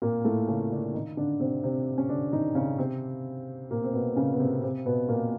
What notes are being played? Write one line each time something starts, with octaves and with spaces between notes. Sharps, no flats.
A#2 A#3
A2 A3
C#3 C#4
D3 D4
D#3 D#4
D3 D4
C3 C4
C3 C4
C#4
D3 D4
D#3 D#4
C#3 C#4
C3 C4
A#2 A#3
C4
B2 B3
C#3 C#4
B3
C3 C4
C3 C4
B2 B3
A#2 A#3